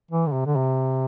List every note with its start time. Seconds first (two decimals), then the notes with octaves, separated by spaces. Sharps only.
0.11 E3
0.27 D3
0.32 C3
0.46 D3
0.55 C3